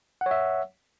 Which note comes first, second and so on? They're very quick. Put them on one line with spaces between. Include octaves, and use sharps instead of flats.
F#5 C#5 E5